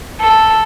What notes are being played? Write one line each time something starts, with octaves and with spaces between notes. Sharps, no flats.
A4